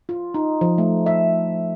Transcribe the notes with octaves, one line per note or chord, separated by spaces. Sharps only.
F4
D#4
F3
A3
E5